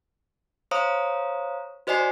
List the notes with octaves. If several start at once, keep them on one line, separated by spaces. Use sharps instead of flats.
C5 C#5 F5 A#5 D#6
F#4 C5 D5 D#5 G#5 C7